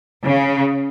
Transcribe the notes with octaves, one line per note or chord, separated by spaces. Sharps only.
C#3